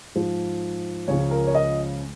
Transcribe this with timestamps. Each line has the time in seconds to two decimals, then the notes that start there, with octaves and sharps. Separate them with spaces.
0.14 G#2 F3
1.08 C#2 C#3 F3 C#5
1.31 A#4
1.47 C#5
1.54 D#5